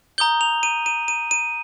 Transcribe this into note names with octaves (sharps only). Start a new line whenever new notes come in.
A#5 D#6 G6 G7
F7
D#7
D#7
D#7
D#7